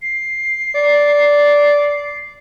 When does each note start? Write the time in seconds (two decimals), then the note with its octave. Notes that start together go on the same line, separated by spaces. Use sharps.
0.02 C7
0.75 D5